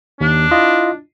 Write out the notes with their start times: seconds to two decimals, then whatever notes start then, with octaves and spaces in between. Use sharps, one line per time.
0.21 D#2 D4
0.51 E4 F4 D#5